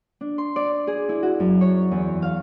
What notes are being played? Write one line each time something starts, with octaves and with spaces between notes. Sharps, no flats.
D4
C6
D5
G#4
E4
F#4
F#2
C#5
E2
F5